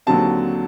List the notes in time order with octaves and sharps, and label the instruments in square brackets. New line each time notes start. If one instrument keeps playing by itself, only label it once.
[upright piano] D#2 D3 F#3 C4 A5